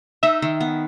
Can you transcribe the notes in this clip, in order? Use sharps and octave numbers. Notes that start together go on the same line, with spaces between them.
D#4 E5
D#3
B3